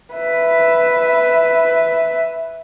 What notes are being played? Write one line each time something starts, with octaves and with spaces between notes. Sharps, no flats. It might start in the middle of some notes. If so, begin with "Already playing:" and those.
B4 E5